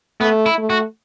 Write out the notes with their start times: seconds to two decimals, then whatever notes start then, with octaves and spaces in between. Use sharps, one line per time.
0.20 A3 B3
0.46 E4
0.58 A3
0.70 F#4